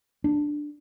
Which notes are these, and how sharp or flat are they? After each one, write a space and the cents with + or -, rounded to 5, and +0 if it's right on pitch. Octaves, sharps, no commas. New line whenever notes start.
D4 +5